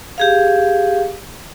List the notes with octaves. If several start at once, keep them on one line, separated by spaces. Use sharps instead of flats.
G4 G#4 F5